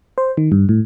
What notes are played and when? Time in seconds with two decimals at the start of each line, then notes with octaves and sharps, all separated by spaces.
0.18 C5
0.37 D#3
0.52 G2
0.69 A2